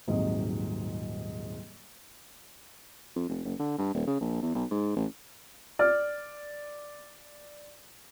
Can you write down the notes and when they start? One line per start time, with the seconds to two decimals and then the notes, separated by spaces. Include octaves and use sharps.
0.07 D#1 G#2 C3 F#3 D#5
3.16 F2
3.29 F1
3.45 F#1
3.59 D3
3.78 G2
3.94 D#1
4.07 C#3
4.21 A#1
4.42 E2
4.55 B1
4.71 G#2
4.96 A1
5.79 D5 F6